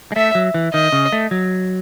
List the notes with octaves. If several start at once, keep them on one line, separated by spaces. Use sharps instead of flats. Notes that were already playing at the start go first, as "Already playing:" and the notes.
G#3
A3 E5
F#3
E3
D#3 D#5
C#3
A3
F#3